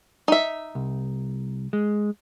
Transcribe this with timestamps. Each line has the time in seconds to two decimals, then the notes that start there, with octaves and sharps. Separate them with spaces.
0.28 D#4 E5
0.75 C2
1.73 G#3